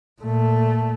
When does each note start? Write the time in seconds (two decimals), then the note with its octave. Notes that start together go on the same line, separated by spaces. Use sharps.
0.21 A#2 A3